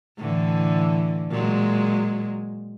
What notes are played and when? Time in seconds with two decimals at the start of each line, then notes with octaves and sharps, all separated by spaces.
0.18 A2 D3 E3
1.30 A#2 F#3 G#3